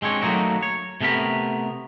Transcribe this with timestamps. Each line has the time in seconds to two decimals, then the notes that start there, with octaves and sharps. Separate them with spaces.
0.02 G#3 C4 D4 C#5
0.22 F#3 A3 A#3 D#4 F#4
0.63 C#5
1.01 C3 A3 B3 A#4 B5